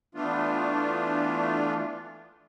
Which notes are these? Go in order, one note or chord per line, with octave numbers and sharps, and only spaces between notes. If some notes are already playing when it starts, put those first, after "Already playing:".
E3 A3 B3 D4 F4